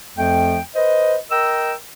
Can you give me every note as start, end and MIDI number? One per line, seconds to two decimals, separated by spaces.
0.17 0.58 41
0.17 0.58 53
0.17 0.58 57
0.17 0.58 79
0.75 1.16 71
0.75 1.16 72
0.75 1.16 75
1.31 1.73 70
1.31 1.73 75
1.31 1.73 79
1.31 1.73 88